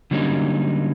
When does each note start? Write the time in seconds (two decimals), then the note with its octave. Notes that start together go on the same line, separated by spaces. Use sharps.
0.11 D3 F#3 G3 A#3 C#4 D#4